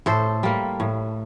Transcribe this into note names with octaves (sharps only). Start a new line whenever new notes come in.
A2 A4 C5
G3 A#3
A2